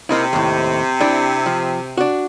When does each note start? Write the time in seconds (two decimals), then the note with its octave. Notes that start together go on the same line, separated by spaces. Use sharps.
0.09 C3 A#3 D#4 E4
0.33 D#2 A2
1.01 D4 E4
1.46 F3
1.98 D4 F#4